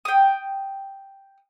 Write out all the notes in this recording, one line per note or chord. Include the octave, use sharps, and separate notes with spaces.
G5 D#6